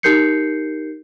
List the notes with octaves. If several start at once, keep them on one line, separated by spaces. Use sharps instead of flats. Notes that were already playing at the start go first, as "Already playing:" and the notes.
D#4 G4 A#4 G6 C7 C#7